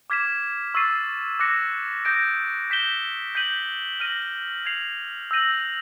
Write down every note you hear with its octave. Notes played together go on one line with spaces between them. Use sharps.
D6 F6 G#6 B6 E7
C#6 E6 A6 C7 D#7
D6 F#6 A#6 C#7
D#6 G6 A#6 D7
G6 B6 E7 G7
G6 B6 D#7 F#7
F6 A#6 D#7 F#7
G#6 C7 F7
E6 G6 A#6 D#7 F#7